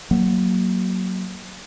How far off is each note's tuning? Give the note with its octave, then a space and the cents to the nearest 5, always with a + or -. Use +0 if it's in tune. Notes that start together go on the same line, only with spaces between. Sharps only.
F#3 +10 A#3 +0